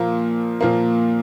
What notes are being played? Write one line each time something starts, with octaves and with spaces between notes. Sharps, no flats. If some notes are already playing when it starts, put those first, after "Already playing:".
Already playing: A#2 F3 A#3
A#2 F3 A#3